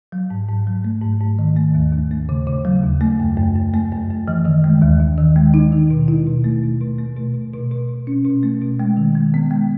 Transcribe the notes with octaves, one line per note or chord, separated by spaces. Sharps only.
F#3
G#2
G#2
F#3
A3
G#2
G#2
D#3
A3
D#2
D#2
A3
C#3
C#3
F#3
D#2
A3
F#2
F#2
F#2
A3
F#2
F#2
E3
D#3
G#3
D#2
D#2
D#3
G#3
D#4
D#3
B2
E4
B2
A3
B2
B2
A3
B2
B2
B2
B2
B2
C#4
B2
A3
B2
G#3
D#3
G#3
B3
G#3